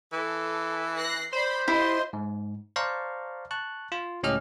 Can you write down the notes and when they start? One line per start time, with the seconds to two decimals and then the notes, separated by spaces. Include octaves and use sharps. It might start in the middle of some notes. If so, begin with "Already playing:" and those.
0.13 E3 A4
0.96 F#6 A#6 C7
1.33 C5 D5 B5 C6
1.68 E4 F4 G4 D#5 C6
2.13 G#2
2.76 C5 D5 F5 A5 A#5 C#6
3.51 A5 C#6 F#6
3.92 F4
4.23 C#2 A2 C#4 G4 D#5 F6